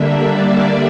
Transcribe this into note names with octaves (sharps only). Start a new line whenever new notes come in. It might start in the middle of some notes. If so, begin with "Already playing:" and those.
Already playing: D3 G3 A#3 D4 E5
D5